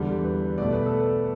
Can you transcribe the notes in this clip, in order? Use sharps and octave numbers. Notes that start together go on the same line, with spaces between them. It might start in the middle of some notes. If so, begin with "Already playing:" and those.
Already playing: E2 D3 G3
B4
B2 A3 D5
B4
A4
B4